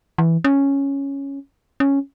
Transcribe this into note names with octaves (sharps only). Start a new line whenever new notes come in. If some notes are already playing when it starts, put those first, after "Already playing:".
E3
C#4
C#4